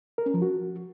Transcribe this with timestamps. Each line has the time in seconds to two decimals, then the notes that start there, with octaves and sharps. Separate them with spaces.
0.18 A#4
0.26 C#4
0.34 F3
0.42 F#4